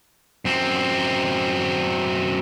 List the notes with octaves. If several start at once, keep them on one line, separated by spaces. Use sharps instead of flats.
F#2 C4